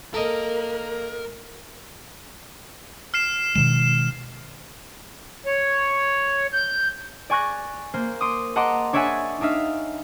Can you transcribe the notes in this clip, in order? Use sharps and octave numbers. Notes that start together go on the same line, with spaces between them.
A#3 A4 A#4 D#5
F6 C7 E7
B2 D#3 G#3 E7
C#5
G6
D5 G#5 C#6 F#6 A#6
A#3 C5
C6 D6 D#6
D#5 F#5 A5 A#5 C6 D6
D4 C#5 D5 E5 F#5 G#5
D4 D#4 E5 F5